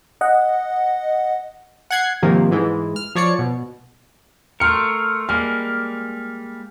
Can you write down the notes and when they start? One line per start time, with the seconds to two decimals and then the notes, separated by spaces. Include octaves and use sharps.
0.21 D#5 F#5
1.91 F#5 F#6 G#6 C7
2.22 G#2 C3 D#3 F3 A#3
2.51 G#2 E3 G#3
2.96 F6
3.15 F3 C#5 D5 C#7
3.39 B2
4.60 A3 A#4 C6 F6 C#7
5.29 G3 G#3 A#3 F6